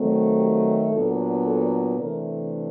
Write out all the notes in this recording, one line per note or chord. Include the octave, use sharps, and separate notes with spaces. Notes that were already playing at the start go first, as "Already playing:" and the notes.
Already playing: D#3 F#3 A3 C4
G4
A#2 F#3 B3 D4 A4
A4
C3 E3 A3 D4 A#4